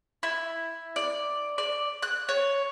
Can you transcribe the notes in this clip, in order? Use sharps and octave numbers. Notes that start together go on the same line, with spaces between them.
E4
D5
D5
F#6
C#5